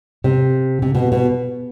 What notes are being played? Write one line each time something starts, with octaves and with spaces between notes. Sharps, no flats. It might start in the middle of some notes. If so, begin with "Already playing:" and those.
C3
C3
B2
B2